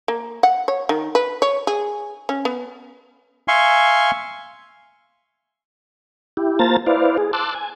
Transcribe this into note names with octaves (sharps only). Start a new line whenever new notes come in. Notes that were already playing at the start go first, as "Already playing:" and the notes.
A#3
F#5
C#5
D#3
B4
C#5
G#4
C#4
B3
E5 F5 G#5 C6 C#6
E4 G4
A#3 F4 C5 A5 A#5 A6
E4 B4 C5 D5 F5
G#4
A5 C6 D6 E6 F#6
G#5